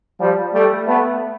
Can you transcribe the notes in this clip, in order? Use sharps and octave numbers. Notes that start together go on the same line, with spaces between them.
F3 G3
G3 A3
A3 B3